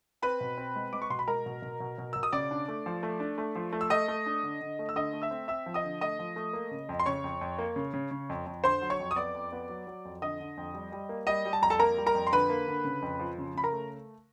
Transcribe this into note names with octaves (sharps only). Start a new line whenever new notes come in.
C4 B4 B5
B2
C4
G#3
G#3 D6
C#6
B2 C6
B5
G#3 A#4 A#5
B2
B2
B2
B2
B2 E6
D#6
C#3 D5 D6
D4
A3
F3
A3
D4
A3
F3
A3
E6
A3 D#5 D#6
A3
D4
D3
D3
A3
E6
D3 D#5 D#6
A3
E5 E6
C4
C4 E5 E6
F3
D#5 D#6
D3
A3 D#5 D#6
F3
A3
A#3
C#3
F2
C6
C#3 C#5 C#6
F2
F2
A#3
C#3
C#3
C#3
F2
F2
D3 C5 C6
F#3
C#5 C#6
F2
D#6
B3 D5 D6
F2
B3
F#3
F#3
F2
D3 D#5 D#6
D3
F2
G3
G3
A#3
G3 D#5 D#6
G3
A5
F2 A#5
A4 A5
A#3 A#4 A#5
G3
A#4 A#5
F2
C6
D3 B4 B5
A#3
D3
C#3
F2
F3
C#3
C#3 B5
A#4 A#5
A3